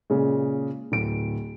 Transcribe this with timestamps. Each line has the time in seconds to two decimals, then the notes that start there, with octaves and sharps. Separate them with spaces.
0.10 A#2 C#3 G#3
0.92 D1 D7